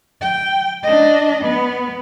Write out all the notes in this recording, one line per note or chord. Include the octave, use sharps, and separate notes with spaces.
G5
D4 D#5
B3